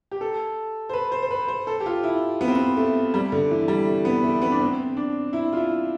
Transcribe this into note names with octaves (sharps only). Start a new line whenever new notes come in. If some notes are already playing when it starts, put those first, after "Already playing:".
G4
A4
C5
B4
C5
C5
B4
C5
A4
G4
F4
E4
B3
C4
B3
A3
G3
D3
E3
G3
A3
B3
A3
B3
D4
C4
D4
E4
F4
E4